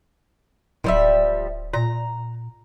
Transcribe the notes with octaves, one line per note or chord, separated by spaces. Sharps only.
D1 F3 G3 E5
A#2 A#5